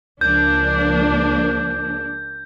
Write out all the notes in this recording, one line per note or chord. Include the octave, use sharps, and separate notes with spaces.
C#2 F3 A#3 D4 G6